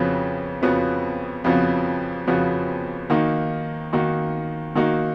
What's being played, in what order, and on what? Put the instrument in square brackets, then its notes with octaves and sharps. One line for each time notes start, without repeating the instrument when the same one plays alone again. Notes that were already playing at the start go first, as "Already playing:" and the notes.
Already playing: [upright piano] F2 C#3 F3 B3 F#4
F2 C#3 F3 B3 F#4
F2 C#3 F3 B3 F#4
F2 C#3 F3 B3 F#4
D#3 A#3 D#4 F#4
D#3 A#3 D#4 F#4
D#3 A#3 D#4 F#4